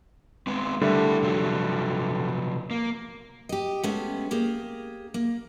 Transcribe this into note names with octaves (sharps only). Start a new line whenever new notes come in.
G#3 B3 C4
D3 G3 A3 E4 A#4 E5
C3 F3 F#3
A#3
G4 D#5
G#3 A3 B3 C#4
A#3 G4 G#4
A#3